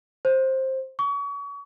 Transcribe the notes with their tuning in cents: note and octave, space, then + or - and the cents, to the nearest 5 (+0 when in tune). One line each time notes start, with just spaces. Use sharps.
C5 +15
C#6 +35